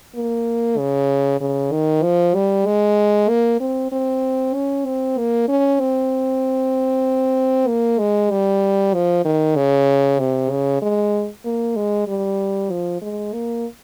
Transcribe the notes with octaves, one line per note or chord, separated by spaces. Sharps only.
A#3
C#3
C#3
D#3
F3
G3
G#3
A#3
C4
C4
C#4
C4
A#3
C#4
C4
A#3
G#3
G3
F3
D#3
C#3
C3
C#3
G#3
A#3
G#3
G3
F3
G#3
A#3